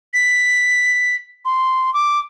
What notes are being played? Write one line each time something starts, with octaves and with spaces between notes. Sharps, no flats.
B6
C6
D6